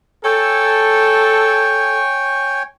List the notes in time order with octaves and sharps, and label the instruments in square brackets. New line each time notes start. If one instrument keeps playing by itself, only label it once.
[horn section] A4 [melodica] C#5 G5 G#5